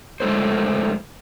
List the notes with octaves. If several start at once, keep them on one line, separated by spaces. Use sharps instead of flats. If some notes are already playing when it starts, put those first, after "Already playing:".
F2 G#3 A3 C5